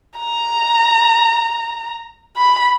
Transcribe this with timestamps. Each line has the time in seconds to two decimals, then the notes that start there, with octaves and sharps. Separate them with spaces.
0.19 A#5
2.37 B5